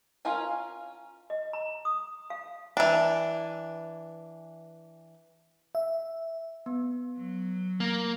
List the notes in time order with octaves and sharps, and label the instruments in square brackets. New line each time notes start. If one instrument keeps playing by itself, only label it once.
[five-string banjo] C#4 F4 A#4 C#5 G#5
[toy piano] D#5
A#5
D#6
F5
[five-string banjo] E3 D4
[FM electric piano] E5
[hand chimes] B3
[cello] F#3
[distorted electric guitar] A#3 [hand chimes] F6 A#6